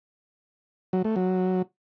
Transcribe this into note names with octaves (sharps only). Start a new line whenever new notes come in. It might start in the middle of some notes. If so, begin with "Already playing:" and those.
F#3
A3
F#3